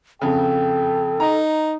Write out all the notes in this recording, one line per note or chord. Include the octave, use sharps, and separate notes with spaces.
F2 C#3 A4 G5
D#4 A#5